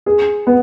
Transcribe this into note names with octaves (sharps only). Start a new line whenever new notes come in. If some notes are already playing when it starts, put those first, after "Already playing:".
G#4
B3